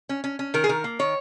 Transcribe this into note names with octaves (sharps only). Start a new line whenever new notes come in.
C#4
C#4
C#4
D#3 A#4
G#4
D#3 A#4
A#3
D#3 C#5